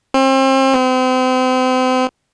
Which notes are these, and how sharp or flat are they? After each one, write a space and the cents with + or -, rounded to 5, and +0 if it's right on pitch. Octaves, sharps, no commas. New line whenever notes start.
C4 +35
C4 -35